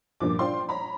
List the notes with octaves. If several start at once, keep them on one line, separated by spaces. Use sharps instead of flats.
G2 A#2 F3 D6
D4 F4 C5 G5 C6
C#5 A#5 B5